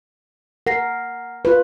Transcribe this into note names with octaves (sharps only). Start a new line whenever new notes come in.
A#4 F#5 A#6 C7
F4 B4